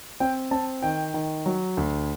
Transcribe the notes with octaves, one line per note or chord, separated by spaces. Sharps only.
C4 G5
C4 A5
D#3 G5
D#3
F#3
D2